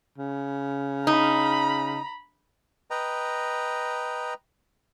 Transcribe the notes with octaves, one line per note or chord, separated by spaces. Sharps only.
C#3
D#4 A#5 B5
B4 D#5 G5 A#5